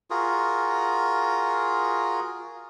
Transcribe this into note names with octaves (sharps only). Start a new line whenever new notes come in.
F4 F#4 G#4 A#4